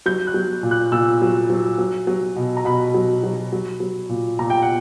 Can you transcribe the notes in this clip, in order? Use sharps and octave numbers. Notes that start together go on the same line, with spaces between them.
F#3 G6
F#6
F#3
A#2
F#6
A#2 E6
F#3
F#3
F#3
F#3
B2
A#5
B2 B5
F#3
F#3
F#3
F#3
A#2
A#2 A#5
G5
F#5